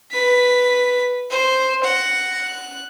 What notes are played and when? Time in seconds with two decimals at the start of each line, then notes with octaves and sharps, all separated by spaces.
0.12 B4 B6
1.31 C5
1.84 F#5 A#6
2.41 F#6